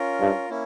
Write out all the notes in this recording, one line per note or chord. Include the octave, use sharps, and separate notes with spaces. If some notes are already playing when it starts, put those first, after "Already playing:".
Already playing: C#4 F4 A#4
G2
A#3 C#4 E4